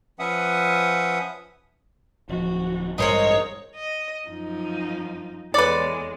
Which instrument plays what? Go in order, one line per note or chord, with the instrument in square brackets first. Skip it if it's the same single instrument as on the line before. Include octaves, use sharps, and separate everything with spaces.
[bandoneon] F3 C#4 B4 E5 F#5 D#6
[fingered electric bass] D1 F3 [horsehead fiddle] F#4
[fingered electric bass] A1 G2 G3 [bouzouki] G#3 C5 D#5 [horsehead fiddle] A#4 [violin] C#5
[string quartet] D#5
F#2 F3 D#4
[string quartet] E2 G#3 [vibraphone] A4 C#5 [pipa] B4 D5